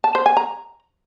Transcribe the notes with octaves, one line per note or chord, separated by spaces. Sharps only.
A5
C5
G#5
A#5